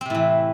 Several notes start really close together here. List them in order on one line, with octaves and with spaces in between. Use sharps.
C4 C3 A2 E3